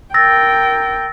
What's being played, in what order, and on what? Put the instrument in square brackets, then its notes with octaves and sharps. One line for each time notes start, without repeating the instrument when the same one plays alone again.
[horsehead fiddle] A#4 G5 [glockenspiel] E6 A6 A#6